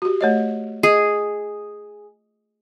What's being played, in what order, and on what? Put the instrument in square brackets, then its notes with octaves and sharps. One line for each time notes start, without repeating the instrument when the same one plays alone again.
[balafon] F#4 G4
A3 C#5 D#5
[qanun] G#4 [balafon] D#5